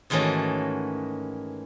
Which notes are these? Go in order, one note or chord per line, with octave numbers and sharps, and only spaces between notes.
G#2 D#3 E3 A3 C#4 F#4